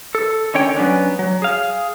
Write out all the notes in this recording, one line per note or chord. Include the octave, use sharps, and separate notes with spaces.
A4
D3 D#3 C#4 C#5 G5
F#3 B3 C#4 D4
F#3
G#4 F5